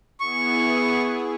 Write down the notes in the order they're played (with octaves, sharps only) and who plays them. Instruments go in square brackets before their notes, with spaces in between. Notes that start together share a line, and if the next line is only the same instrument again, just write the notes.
[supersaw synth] B3 E4 G#4 [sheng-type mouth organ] C#6